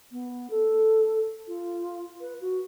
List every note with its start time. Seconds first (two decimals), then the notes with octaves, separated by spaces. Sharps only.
0.12 B3
0.50 A4
1.48 F4
2.21 B4
2.41 F#4